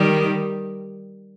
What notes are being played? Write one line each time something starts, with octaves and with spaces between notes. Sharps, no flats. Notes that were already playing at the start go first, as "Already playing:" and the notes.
Already playing: D#3 G3